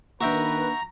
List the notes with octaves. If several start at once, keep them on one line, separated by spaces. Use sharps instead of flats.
D#3 A#3 D4 F#4 B4 E5 G5 A#5